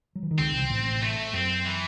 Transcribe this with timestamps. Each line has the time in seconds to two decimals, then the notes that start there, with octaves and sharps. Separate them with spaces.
0.15 F#3
0.23 E3
0.31 D#3
0.38 C#2 C#3 C4
0.54 C2 C3
0.70 A1 A2
1.02 A3
1.33 F#2 C4
1.65 E3